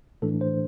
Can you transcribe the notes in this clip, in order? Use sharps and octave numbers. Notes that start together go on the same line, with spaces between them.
A2 E3 A3 D4 A4
C5